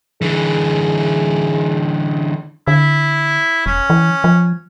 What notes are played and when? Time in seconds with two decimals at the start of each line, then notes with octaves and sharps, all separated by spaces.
0.22 D3 E3 G#4
2.67 D3 E4
3.66 E1 C#4
3.90 E3
4.24 F3